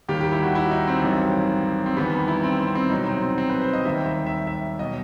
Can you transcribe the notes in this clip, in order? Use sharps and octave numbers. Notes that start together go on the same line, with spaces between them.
D#2 D#3 G3 G4
G4
E4
F#4
E4
D#4
C4
A1 G2 D#3 F#3
C4
E2 D#3 G3 B3
E4
C4
C4
C4
C2 B2 F#3 D#4
C4
C4
C4
B4
C5
D#5
D#2 D#3 G3 E5
E5
E5
E5
B2 F#3 D#5